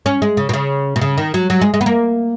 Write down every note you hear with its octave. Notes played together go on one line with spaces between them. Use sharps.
C#4
G#3
C#3
B2
C#3
B2
C#3
D#3
F#3
F#3
G#3
G#3
B3
A#3